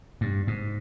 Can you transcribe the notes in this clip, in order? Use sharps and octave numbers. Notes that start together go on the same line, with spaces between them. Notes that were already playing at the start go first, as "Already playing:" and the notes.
G2
G#2